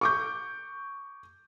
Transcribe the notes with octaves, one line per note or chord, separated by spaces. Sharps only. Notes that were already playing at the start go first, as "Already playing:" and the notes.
C#6 D6 G6